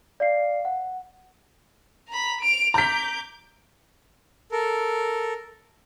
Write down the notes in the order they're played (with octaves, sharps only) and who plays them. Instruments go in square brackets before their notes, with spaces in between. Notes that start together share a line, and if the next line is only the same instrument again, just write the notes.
[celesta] D5 F5 C7
F#5
[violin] A#5 B5
D7 F7
[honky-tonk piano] A#5 B6 [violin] D6 G6
[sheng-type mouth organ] A4 A#4